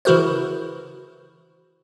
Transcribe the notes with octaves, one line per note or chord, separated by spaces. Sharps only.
C#3 E3 E4 F#4 A#4 C5